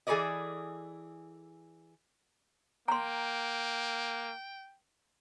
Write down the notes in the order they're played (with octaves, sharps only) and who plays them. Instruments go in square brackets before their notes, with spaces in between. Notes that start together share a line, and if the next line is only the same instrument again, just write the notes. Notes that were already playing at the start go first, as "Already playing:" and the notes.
[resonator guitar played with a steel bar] E3 G#4 A4 B4 D5 D#5
[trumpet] A#3 [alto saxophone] G5 [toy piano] A#5 C6